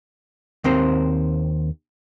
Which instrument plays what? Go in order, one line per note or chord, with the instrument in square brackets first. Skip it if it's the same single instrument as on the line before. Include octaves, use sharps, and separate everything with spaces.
[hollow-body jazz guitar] D#2 C4 A#4 C5